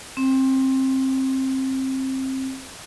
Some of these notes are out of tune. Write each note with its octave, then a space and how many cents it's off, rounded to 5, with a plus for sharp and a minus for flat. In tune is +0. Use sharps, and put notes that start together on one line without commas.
C4 +20